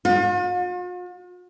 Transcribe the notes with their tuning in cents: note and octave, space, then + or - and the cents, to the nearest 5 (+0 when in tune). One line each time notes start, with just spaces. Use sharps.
F4 +45